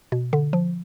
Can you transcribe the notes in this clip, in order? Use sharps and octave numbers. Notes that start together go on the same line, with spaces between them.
B2
D3
F3